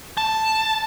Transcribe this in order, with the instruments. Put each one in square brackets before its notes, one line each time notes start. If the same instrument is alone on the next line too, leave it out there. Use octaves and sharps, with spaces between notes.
[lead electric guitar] A5